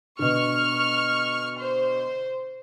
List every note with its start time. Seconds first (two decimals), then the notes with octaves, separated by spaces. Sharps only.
0.19 B2 D3 C#6 F6
1.56 C5